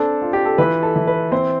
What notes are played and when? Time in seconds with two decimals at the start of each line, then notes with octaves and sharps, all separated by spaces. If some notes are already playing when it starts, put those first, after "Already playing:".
Already playing: C4 D4 A4
0.22 F4
0.33 G4
0.45 A4
0.58 E3 B4
0.83 A4
0.96 E3
1.07 B4
1.32 C4 C5